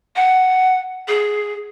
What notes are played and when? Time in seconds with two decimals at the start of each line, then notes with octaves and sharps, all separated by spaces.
0.16 F#5
1.08 G#4